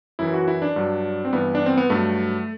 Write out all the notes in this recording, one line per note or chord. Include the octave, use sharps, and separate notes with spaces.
F#2 E3 E4
F#4
E4
D4
G2 F#3
C4
G2 E3 B3
D4
C4
B3
G2 F#3 A3